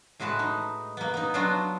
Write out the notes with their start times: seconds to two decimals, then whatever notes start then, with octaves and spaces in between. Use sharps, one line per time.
0.20 A2 G#3 F#4 B4 A5
0.39 D#4
0.97 A#3 B3
1.14 B3 D#4
1.34 F#3 B3 D4 F4 F#4